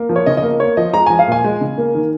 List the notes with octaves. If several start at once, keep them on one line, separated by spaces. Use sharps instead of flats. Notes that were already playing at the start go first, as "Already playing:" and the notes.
Already playing: A#3
F3
C#5
C#3 D#5
D#5
A#3
A#3 C#5
F3 D#5
G#3 A#5
F3 G#5
F5
A#2 G#5
G#3
C#3
A#3
D#3